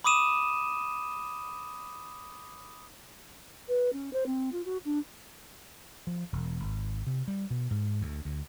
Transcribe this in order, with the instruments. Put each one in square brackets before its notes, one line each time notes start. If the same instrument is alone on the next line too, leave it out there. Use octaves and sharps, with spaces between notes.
[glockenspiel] B5 D6 D#6 D#7 E7
[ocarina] B4
C#4
C5
C4
F4
F#4
D4
[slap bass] F3
E1
G#1
C3
G3
B2
G#2
D2
D2